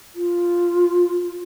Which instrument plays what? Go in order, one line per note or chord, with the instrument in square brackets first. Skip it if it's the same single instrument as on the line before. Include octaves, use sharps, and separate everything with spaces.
[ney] F4